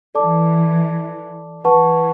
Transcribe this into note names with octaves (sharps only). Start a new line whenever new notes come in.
E3 A4 D5 A5 D6
E3 B4 F#5 A5 C#6